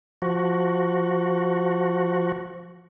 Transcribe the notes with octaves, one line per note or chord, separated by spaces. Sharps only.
F3 F#4